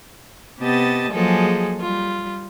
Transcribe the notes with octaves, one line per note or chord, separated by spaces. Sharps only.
C3 B3 G4 D#5 A5 A6
F3 F#3 G#3 A#3 G#4 A4
G3 F4